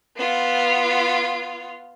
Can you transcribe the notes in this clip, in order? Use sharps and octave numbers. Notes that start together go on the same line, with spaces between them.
B3 F4